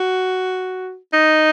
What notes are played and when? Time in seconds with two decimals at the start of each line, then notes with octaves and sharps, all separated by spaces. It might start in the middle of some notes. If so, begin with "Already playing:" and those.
Already playing: F#4
1.13 D#4